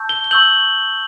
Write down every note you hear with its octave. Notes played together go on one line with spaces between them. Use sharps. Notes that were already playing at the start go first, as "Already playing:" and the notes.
Already playing: A5 C#6 E6 G6
G7
G7
C#6 E6 G6 F#7